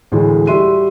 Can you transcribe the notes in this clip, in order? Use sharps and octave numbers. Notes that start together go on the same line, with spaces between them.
D2 A2 E3 G#3
G3 F#4 E5 C6 D#7